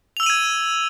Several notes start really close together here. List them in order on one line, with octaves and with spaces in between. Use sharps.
F7 E6 F#7 D#7 G#6